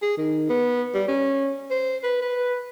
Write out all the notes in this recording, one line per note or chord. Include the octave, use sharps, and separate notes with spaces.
G#4
D#3
B3
G3
C#4
C5
B4
B4